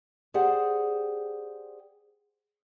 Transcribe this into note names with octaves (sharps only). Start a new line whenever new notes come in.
G4 G#4 C5 D5 F#5 G5